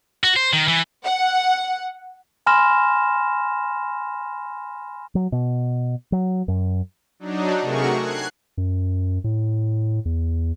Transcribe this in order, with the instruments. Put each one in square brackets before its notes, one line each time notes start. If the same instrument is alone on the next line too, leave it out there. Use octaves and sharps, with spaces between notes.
[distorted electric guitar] F#4
C5
D#3
E3
[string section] F#5
[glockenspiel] G#5 B5 C6 F6 A#6 E7
[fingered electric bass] F#3
B2
F#3
F#2
[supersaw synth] F#3 D4 D#4
C3 A3 F#4 G#4 A#4 C#6
F#6 G#6 C7
[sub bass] F#2
A2
E2